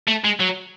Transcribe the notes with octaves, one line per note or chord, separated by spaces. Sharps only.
A3
G#3
F#3